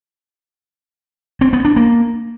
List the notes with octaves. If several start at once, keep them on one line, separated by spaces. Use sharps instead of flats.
C4
B3
D4
A#3